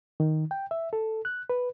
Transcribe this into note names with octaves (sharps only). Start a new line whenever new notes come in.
D#3
G5
E5
A4
F#6
B4